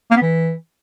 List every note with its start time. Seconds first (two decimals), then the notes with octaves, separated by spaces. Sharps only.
0.11 A#3
0.16 B3
0.22 E3